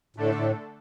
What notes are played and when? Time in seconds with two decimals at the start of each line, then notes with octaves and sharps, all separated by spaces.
0.16 A2 D3 A3 D4 A4
0.35 A2